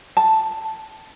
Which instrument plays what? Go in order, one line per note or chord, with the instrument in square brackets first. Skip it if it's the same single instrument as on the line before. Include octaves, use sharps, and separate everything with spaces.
[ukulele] A5